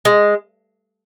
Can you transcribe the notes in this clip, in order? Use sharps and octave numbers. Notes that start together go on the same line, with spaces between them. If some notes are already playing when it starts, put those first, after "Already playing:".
G#3